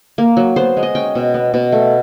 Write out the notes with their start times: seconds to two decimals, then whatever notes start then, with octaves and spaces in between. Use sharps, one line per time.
0.18 A#3
0.37 F#3
0.56 B3 C5
0.77 G#3
0.83 D#5
0.95 C#4 G5
1.15 B2
1.34 B3
1.54 B2
1.72 A3